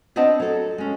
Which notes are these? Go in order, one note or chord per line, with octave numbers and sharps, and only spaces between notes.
B3 C4 D4 D#5 F#5 A5
F#3 A4
G#3 C#4